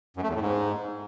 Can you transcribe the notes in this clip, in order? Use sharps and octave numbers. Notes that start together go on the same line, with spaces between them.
F#2
A3
E2
A2
G#2